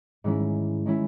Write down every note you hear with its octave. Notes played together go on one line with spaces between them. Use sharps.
G#2 D#3 G#3 C#4 E4
D#3 G#3 C#4 E4